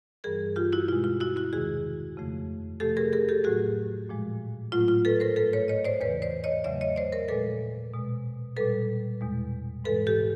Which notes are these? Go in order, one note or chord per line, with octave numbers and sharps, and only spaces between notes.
G2 E3 G3 G#4 A#4
F4 G4
E4 F#4
B2 G#3 F4
F4
E4 F#4
E4 F#4
E2 C3 D#3 G#3 F#4 G#4
F2 C#3 F3 A3
C3 F3 A3 G4 A4
G#4 A#4
G#4 A#4
G4 A4
A2 F#3 A3 F#4 G#4
A#2 F3 G#3
A2 F#3 A3 F4
F4
A4 B4
A#4 C5
G#2 F3 A3 A4 B4
B4 C#5
C#5 D#5
C5 D5
E2 C#3 E3 B4 C#5
C5 D5
C#5 D#5
E2 C#3 F#3 A3 D5 E5
C#5 D#5
C5 D5
A#4 C5
A#2 F3 G#3 A4 B4
B2 G#3
A#2 G3 A4 B4
E2 B2 G#3
G#2 E3 G#3 A4 B4
G4 A4